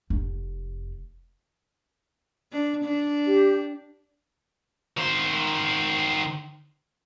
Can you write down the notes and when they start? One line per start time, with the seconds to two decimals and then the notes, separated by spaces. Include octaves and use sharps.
0.10 F1
2.52 D4
2.84 D4
3.26 G4
4.98 D#3 C5